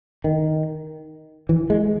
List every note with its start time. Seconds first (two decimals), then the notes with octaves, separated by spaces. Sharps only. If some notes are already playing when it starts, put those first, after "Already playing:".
0.24 D#3
1.49 E3
1.70 G#3